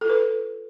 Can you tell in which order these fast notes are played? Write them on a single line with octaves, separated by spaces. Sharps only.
A4 F4 B4